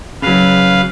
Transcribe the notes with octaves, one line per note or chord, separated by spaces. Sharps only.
C#3 F#3 B4 F5